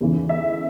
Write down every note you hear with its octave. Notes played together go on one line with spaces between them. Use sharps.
E2 C#3 E3
E5